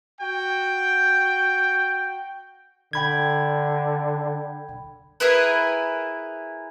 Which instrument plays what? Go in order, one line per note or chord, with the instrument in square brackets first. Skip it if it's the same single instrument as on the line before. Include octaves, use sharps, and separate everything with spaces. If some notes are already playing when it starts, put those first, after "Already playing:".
[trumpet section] F#4 G5
[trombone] D3 [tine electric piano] G5 B5 G#6
[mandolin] E4 G#4 A#4 B4